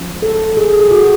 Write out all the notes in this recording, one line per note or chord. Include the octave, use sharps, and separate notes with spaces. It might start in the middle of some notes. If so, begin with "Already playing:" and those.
Already playing: F3 G#3 C#4
A4
G#4
G#4
F#4